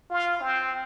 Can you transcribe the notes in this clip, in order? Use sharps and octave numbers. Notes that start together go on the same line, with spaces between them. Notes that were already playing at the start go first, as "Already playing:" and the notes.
F4
C4